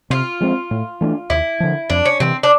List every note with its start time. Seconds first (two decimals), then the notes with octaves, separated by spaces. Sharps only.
0.10 C3 F4
0.40 F3 G#3 C4
0.71 A2
1.01 E3 A3 D4
1.30 D#2 E4
1.60 D3 F3
1.90 F2 D4
2.05 C#4
2.20 C3 E3 C4
2.43 D4